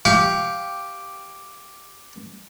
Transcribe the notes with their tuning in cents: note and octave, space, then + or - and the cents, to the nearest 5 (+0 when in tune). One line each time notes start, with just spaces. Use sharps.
G4 +0 F5 +5 C#6 +45